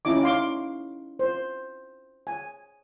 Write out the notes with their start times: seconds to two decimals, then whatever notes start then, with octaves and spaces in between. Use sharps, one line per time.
0.05 C#4 D#4 E4 D#5 D6
0.23 F5 C6 D6
1.19 C5
2.27 G#5